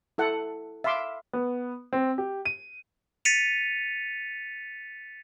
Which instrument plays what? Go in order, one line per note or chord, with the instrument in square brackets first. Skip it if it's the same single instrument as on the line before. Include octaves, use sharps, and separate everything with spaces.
[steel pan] E4 A4 F#5
E5 F5 B5 C6 D6
[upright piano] B3
C4
G4
D#7
[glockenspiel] A6 B6 C#7 D#7 F7